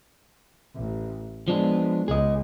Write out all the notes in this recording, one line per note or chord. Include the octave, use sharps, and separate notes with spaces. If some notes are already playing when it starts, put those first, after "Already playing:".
A1
F3 G#3 B3 D4
C#2 G#4 D#5